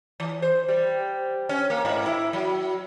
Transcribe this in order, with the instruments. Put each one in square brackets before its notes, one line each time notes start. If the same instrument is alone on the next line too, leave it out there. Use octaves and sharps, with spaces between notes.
[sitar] E3
C5
G3
C#4
A#3
G#2
E4
F#3